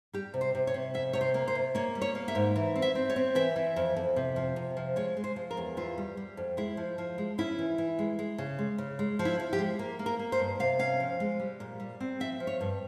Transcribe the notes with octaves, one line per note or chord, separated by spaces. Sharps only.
G3 G4
C3
C5
C3
C#5
C3
F2 E5
C3 C#5
C5
A#3
C5
C3
A#3 C#5
G3
C#5
A#3
E5
G#2
E3
C4
E5
C4
C#5
C4
E3 E5
E3
F2
F2
C3
F3
C3
F3
G#3 C#5
G#3
C5
F3
A#4
E2
E3 F4
G3
G3
F2
G#3 E4
F3
F3
G#3
C#4 E4
E3
E3
G#3
G#3
C#3
G#3
C#3
G#3
F3
E4
F3
G4
G#3
A#3
A#3
A#4
A#3
C5
G2
C3 F5
C#4 F5
F3
G#3
G3
A#2
G3
C4
F3 E5
F3
C#5
G2